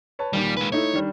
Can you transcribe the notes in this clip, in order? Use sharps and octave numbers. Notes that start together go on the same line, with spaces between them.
B4 C#5 A5
D#2 A#2 D#3 G3
G#3 B4
A3 D#4 E4 C#5
D#3 G3 D4